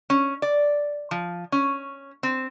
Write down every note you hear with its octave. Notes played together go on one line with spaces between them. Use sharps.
C#4
D5
F3
C#4
C4